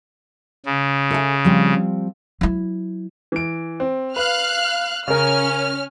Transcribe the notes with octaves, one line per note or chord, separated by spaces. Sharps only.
C#3
A4 E5 G#5
F3 G3 C4
F#3 E4
E3 D7
C4
B4 F5 F6 F#6
C#3 C#4 A#4 F6